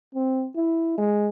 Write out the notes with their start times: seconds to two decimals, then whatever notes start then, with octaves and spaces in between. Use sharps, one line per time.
0.15 C4
0.56 E4
0.98 G#3